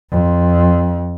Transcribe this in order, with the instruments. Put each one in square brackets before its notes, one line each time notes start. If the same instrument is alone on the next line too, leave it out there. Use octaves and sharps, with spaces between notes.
[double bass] F2